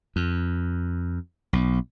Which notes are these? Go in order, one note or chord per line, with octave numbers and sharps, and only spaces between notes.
F2
B1